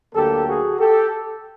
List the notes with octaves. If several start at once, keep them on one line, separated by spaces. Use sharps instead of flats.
D2 D3 F#3 A#3 G4 A4
F#4 G#4
G4 A4